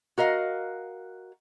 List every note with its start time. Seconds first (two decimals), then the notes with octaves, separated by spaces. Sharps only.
0.18 F#4 A#4 D#5 F5